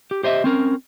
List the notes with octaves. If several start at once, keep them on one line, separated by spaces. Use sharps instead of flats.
G4
G4 C5 D#5 E5
C4 C#4 A#4